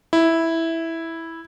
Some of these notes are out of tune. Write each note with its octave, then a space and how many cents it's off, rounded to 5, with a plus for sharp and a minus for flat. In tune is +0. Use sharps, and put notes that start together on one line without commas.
E4 -5